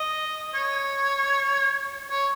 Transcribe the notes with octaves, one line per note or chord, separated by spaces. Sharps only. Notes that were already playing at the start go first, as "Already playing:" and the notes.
Already playing: D#5
C#5
C#5